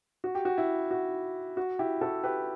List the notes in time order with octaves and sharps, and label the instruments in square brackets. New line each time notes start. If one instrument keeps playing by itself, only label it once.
[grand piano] F#4
G4
F#4
E4
F#4
F#4
E4 G4
F#4 A4
G4 B4